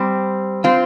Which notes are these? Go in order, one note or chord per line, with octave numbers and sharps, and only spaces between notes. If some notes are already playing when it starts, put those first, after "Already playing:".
Already playing: G3 C4
C4 F4